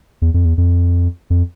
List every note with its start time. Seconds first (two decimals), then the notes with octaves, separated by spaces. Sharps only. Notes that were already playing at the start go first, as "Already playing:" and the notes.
0.22 E2
0.34 F2
0.45 E2
0.58 F2
1.30 F2